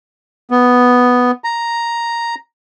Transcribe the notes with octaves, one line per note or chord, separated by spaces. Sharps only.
B3
A#5